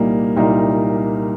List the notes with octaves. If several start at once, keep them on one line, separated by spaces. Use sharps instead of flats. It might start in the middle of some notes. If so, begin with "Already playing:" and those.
Already playing: C2 A#2 G3 A#3 D#4
C2 A#2 G3 A#3 D#4